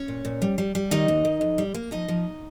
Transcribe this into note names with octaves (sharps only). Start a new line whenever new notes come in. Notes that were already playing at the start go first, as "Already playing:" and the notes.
Already playing: C#4 C#5
A#2
A#2
G3
G3
G3
D#3 D#4 D#5
D#2
D#3
F2
G3
A#3
F3 D#4 D#5
F3